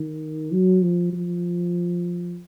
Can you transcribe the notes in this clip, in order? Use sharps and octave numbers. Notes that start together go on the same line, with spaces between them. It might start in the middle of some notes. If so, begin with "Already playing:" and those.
Already playing: D#3
F#3
F3
F3